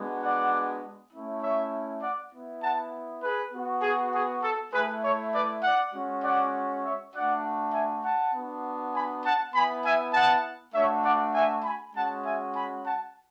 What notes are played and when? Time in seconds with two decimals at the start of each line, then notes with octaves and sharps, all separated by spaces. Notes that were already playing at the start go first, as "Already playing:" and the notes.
Already playing: G#3 B3 D4 F#4
0.22 D5 F#5
1.12 A3 C#4 E4
1.42 C#5 E5
2.02 D5 F#5
2.32 B3 E4
2.62 F#5 A5
3.23 G#4 B4
3.52 B3 F#4
3.82 G#4
4.13 G#4
4.42 A4
4.72 A3 E4 G#4 B4
5.03 A4 C#5
5.32 B4 D5
5.63 D5 F#5
5.94 G#3 C#4 F#4
6.23 D5 F#5
6.83 C#5 E5
7.13 A3 D4 F#4 D5 F#5
7.73 E5 G#5
8.04 F#5 A5
8.33 B3 D4 F#4
8.94 G#5 B5
9.24 F#5 A5
9.54 B3 E4 G#5 B5
9.84 E5 G#5
10.14 F#5 A5
10.75 A3 D4 F#4 C#5 E5
11.04 D5 F#5
11.34 E5 G#5
11.64 G#5 B5
11.94 G#3 C#4 F#4 F#5 A5
12.24 E5 G#5
12.54 G#5 B5
12.84 F#5 A5